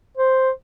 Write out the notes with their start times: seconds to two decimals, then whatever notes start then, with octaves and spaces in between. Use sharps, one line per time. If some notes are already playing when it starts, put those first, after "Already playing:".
0.17 C5